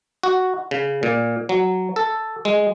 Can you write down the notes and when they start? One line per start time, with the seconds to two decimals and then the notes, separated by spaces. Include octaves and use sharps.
0.23 F#4
0.71 C#3
1.03 A#2
1.49 F#3
1.96 A4
2.45 G#3